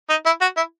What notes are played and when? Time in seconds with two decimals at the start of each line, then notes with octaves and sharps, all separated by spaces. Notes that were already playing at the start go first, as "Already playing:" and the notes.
0.10 D#4
0.26 E4
0.41 F#4
0.57 E4